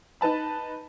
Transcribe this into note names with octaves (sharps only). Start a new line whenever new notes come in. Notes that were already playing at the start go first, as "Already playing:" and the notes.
D#4 B4 A5 B5